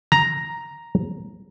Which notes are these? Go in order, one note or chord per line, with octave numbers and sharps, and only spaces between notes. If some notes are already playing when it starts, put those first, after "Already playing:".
A#5